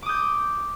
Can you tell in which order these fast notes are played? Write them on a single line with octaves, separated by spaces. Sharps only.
D6 D#6 G6